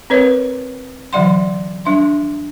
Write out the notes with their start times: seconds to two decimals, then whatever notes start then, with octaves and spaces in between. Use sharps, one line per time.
0.10 C4 A#4 B4 C#5 D#5
1.13 D3 E3 F#3 D5 F#5 C6
1.85 G3 D4 E5 C6